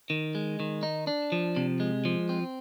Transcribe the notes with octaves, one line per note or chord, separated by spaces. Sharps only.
D#3
G#3
D#3
D#4
D4
F3
C3
G#3
F3
C4